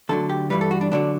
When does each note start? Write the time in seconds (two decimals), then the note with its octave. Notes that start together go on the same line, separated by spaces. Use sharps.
0.09 D2 D3 F#3 A4
0.29 G4
0.50 G2 E3 G3 B4
0.61 A4
0.71 F#4
0.81 D4
0.91 D2 D3 F#3 D4